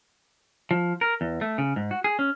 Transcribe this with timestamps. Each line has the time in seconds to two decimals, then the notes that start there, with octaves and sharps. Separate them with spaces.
0.71 F3
1.01 A#4
1.21 E2
1.41 A3
1.58 C#3
1.76 G#2
1.91 F#4
2.04 G#4
2.19 C#4